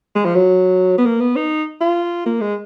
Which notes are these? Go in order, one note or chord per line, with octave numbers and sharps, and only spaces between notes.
G#3
F3
F#3
B3
A#3
B3
D#4
F4
A#3
G#3